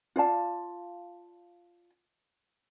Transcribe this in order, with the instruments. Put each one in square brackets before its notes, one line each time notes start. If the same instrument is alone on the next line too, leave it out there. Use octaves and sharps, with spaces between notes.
[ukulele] F4 D5 F5 A5